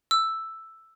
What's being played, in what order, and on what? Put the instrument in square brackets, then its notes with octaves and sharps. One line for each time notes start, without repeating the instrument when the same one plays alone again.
[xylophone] E6